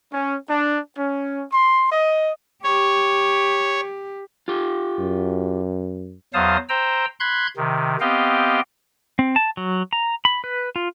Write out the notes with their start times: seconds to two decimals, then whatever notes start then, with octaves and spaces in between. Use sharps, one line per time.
0.11 C#4
0.48 D4
0.97 C#4
1.51 C6
1.91 D#5
2.64 G4 C#5
4.48 F4 G4
4.99 F#2
6.34 E2 F#3 C5 F5 A5 D#6
6.69 C5 G5 A#5 E6
7.20 B5 C6 F#6 G#6
7.57 C3 D#3
8.00 B3 C4 G4 D#5 F5 G5
9.19 C4
9.36 A5
9.57 F#3
9.93 A#5
10.25 B5
10.44 B4
10.76 F4